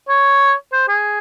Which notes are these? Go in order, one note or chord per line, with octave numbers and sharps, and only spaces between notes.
C#5
C5
G#4